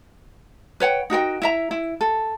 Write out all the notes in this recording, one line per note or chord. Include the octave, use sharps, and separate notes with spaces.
B4 C#5 F#5 G5
D#4 F#4 A#4 G5
E4 E5 A#5
E4
A4